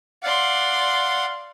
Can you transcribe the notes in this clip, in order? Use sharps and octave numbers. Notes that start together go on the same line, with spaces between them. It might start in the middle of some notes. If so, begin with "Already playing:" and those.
D5 F5 F#5 C6